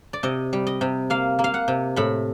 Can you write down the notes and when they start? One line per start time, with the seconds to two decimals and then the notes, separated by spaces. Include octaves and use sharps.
0.13 D5
0.23 C3 D#5
0.53 G3
0.67 D#5
0.81 C3
1.10 A#3 F5
1.39 A#3
1.44 F5
1.54 F#5
1.68 C3
1.96 A2 B5